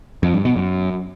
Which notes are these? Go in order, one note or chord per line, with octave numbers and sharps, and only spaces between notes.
F2
G2
B2
F#2